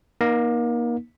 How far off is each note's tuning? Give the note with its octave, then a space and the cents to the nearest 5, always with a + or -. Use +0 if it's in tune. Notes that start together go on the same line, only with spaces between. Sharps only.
A#3 +30 D#4 +0